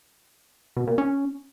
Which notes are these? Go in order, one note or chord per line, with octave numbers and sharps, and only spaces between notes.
B2
A#2
C#4